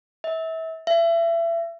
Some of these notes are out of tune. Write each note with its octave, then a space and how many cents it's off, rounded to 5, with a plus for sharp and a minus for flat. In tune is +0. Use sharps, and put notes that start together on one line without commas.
E5 -30
E5 +30